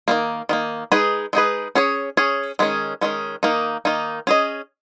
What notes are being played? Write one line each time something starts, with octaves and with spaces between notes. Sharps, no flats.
D#3 G3 A#3
D#3 G3 A#3
G#3 D#4 G#4 B4
G#3 D#4 G#4 B4
C#4 G#4 C#5
C#4 G#4 C#5
D#3 G#3 C#4
D#3 G#3 C#4
D#3 A#3 D#4
D#3 A#3 D#4
C#4 G#4 D#5